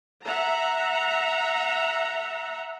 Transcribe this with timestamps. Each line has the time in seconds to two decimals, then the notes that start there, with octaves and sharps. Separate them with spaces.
0.24 E5 F#5 A#5